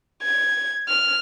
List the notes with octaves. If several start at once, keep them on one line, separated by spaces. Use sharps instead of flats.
G#6
F6